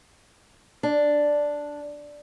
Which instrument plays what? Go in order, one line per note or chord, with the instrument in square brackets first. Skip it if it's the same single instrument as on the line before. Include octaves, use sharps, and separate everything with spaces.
[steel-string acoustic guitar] D4